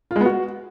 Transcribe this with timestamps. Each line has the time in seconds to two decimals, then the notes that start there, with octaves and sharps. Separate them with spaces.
0.11 F4
0.16 G#3
0.21 B3
0.26 F#4